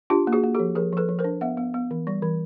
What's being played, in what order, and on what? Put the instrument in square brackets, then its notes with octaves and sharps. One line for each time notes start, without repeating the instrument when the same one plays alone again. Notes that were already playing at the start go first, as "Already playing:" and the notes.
[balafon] D4 F4 G4
A#3
F#4 G#4
A#3
G4 A4
F3
F3 G#4 A#4
F3 A4 B4
F3
A#4 C5
D4
B3 E5 F#5
B3
B3
E3
G3
E3